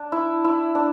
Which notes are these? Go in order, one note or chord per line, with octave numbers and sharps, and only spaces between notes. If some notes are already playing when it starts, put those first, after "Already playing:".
Already playing: D4
E4
E4
D4